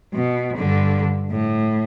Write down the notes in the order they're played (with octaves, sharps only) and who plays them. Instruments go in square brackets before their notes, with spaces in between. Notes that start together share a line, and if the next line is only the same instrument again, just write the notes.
[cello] B2
G2 D3
A2